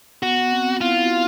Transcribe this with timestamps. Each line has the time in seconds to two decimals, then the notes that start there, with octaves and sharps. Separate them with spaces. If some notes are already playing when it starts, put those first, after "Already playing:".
0.22 B3 F#4
0.52 C4
0.81 E4 F4
1.01 F#4